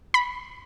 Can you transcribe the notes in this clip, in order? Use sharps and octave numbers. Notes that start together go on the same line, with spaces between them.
B5